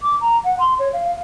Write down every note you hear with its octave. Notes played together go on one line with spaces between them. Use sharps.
D6
A#5
F#5
C6
C#5
F5
F5